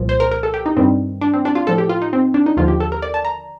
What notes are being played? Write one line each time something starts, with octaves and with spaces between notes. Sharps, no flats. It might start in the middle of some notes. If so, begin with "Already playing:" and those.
Already playing: C2 A#2 F3
C5
A#4
A#4
A4
G4
D#4
G2 D#3 G3 C4
D4
C4
D4
F4
A2 F3 A4
G4
F4
D#4
C4
D4
D#4
D#2 D3 F3 F4
G4
A4
A#4
D5
A5
A#5